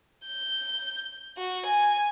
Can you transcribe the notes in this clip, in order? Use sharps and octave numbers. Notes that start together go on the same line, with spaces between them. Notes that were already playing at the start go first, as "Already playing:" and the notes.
G6
F#4
G#5